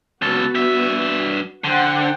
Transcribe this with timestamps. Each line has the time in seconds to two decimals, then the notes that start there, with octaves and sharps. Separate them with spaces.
0.22 C#2 B3 F#4 A4
0.55 G2 E5
1.64 D3 C5 F#5 G5